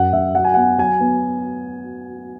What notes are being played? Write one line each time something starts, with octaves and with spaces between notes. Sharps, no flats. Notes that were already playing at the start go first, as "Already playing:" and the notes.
Already playing: F#2 F#5
F#2 E5
F#3 F#5
G#5
B3 F#5
F#3 G#5
B3